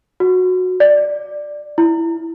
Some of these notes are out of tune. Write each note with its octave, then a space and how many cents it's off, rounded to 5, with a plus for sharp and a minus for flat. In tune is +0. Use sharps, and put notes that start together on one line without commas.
F#4 -10
D5 +5
E4 +5